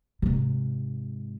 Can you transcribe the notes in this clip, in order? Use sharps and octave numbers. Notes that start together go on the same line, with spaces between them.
G#2 C3